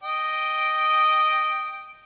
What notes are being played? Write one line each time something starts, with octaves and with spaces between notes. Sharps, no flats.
D#5 G5